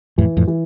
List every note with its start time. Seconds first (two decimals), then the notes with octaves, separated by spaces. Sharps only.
0.18 F2 A2 E3
0.37 F2 A2
0.47 E3